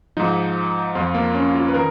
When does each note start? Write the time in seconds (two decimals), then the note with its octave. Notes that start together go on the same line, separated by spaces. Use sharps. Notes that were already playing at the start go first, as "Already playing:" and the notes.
0.17 G#2 F3 D#4
0.95 F2 F3 F4
1.14 A#3
1.35 C#4
1.54 F4
1.68 B4
1.74 D#3 A#4